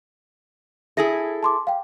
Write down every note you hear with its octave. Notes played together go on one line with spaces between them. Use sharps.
E4 G#4 A4 E5 A#6
A5 C6 D6
F5 G5